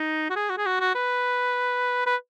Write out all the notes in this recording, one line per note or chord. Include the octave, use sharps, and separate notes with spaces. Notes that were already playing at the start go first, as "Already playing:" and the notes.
Already playing: D#4
F#4
G#4
F#4
G#4
F#4
F#4
B4
B4